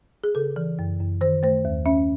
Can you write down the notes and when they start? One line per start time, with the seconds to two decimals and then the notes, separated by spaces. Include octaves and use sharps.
0.24 G#4
0.35 C#3 A4
0.56 E3
0.79 F#2
1.00 F#2
1.21 D#3 C5
1.43 A3 C5
1.65 D#2
1.86 C#4 E5